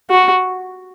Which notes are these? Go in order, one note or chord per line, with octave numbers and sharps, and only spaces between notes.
F#4